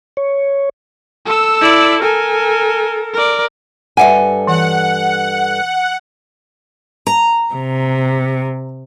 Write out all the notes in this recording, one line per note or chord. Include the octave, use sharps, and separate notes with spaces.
C#5
A4 E6
E4 D5
A4 A#4 G#5
A#4 D5
G2 A4 E5 F#5 G#5
E3 F#5
A#5
C3